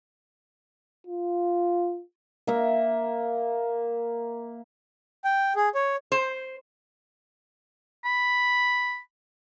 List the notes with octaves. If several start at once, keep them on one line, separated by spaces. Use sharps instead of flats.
F4
A#3 E5
G5
G#4
C#5
C5
B5